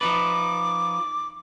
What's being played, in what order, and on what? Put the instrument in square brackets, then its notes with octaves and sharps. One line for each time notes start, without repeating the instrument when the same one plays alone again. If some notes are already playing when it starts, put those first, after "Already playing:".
[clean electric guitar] F3 D#4 B4 [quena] D6